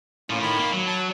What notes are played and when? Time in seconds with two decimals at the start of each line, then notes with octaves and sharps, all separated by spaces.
0.30 A2 A#3 C#4 F4
0.41 D#3 B5
0.58 A#3
0.73 F#3
0.87 A5